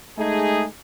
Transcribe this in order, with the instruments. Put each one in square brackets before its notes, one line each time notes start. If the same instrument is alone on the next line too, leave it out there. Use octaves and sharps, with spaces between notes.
[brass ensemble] G#3 A3 D#4 G#4